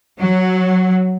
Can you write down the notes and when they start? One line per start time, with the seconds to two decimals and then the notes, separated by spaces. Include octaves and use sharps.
0.20 F#3